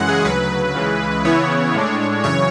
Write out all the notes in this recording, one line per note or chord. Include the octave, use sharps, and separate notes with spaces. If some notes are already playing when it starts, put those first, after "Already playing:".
Already playing: F#2 C#3 E3 G#3 F#5
G#4
D2 C#3 F#3 B4
C#2 C#3 E3 G#3
C#3 E3 B3 E4 C#5
A2 G#3 D4
F#2 C#3 E3 C#5